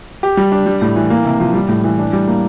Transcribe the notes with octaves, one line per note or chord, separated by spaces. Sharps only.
G4
G3
D4
G3
A2
E3
A#3
C3
F3
G3
A2
E3
D4
G3
A#3